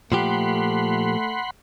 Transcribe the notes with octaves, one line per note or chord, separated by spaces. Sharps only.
A#2 F3 A3 G4 F#5 B5 C6